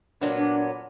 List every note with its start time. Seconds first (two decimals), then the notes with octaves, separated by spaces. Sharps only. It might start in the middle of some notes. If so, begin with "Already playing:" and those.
0.21 A#2 F#3 B3 D4
0.37 D4